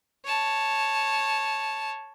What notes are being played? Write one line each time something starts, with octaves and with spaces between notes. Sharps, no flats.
C#5 A5